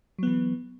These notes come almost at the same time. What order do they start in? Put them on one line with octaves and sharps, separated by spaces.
F#3 B3 E3